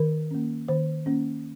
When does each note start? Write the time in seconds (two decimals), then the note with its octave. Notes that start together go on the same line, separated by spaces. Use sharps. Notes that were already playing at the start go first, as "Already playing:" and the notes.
Already playing: D#3 A#4
0.31 A#3 C#4
0.68 D#3 C5
1.06 A#3 C#4